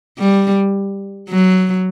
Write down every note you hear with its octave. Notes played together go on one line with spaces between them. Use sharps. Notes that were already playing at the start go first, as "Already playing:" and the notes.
G3
F#3